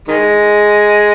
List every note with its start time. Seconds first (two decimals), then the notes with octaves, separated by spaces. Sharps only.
0.08 D#3 G#3